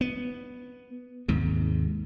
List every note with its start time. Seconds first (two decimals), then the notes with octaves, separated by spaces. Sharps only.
0.01 B3
1.28 D#2 G#2 C3